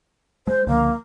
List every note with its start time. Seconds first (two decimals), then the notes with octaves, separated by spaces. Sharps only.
0.47 G#3 C5
0.67 C#2 D3 F3 A#3